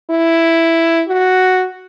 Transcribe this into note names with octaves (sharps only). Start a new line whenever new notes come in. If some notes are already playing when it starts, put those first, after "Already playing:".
E4
F#4